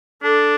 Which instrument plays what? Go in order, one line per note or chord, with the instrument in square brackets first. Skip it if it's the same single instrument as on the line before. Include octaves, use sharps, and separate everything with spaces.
[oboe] D4 [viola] A4